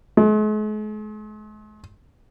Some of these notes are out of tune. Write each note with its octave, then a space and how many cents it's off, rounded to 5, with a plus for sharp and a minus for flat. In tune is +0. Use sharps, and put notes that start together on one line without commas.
G#3 +45